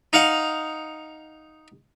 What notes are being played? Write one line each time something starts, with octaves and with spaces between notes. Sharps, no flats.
D#4 F5 F#5